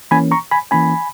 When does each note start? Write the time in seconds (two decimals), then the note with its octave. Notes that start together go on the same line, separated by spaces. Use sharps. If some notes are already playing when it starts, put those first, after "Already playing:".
0.11 E3 A#3 C#4 G#5 B5
0.31 A#5 C#6
0.51 G#5 B5
0.71 E3 A#3 C#4 G#5 B5